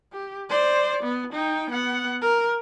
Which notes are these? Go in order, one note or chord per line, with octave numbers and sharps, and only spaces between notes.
G4
C5 D5
B3
D#4 G5
B3 F#5
A#4